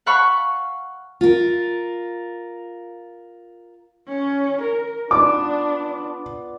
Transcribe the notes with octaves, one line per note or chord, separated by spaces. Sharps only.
F5 F#5 A5 B5 C#6 F6
F4 A#4
C#4
A#4
B3 D4 F4 D5 D6